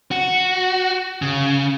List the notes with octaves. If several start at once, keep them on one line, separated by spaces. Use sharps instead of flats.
F#4
C#3